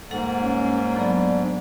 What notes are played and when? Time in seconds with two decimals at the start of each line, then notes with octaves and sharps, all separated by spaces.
0.11 G#2 G3 A#3 A4 F#5
0.42 C#4
0.96 F#3 B3 D4 A4